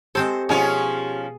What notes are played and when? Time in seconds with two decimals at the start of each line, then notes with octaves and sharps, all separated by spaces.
0.15 G#3 C4 G4 A4 C5
0.49 B2 F3 C#4 F4 G#4